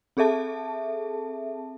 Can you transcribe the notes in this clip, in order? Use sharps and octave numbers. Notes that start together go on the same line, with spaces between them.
C4 G#4 A4 E5 A5